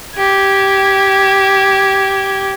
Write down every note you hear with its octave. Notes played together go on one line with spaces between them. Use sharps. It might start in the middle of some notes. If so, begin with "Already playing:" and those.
G4 G#6